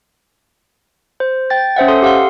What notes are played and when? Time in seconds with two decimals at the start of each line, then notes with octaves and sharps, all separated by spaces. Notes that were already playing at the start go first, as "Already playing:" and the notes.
1.20 C5
1.50 G5 A6
1.76 C#4 C5 E5 F#5
1.88 A4 C6 D#6
2.02 G4 F5 F#5 C6